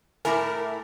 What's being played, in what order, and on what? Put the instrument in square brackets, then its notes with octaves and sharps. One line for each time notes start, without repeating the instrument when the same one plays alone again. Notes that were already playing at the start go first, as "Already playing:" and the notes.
[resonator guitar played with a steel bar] A2 A3 E4 [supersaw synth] A#4 [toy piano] G#5 B5 D6